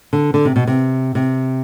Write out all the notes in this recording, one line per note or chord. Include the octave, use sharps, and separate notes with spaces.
D3
D3
C3
B2
C3
C3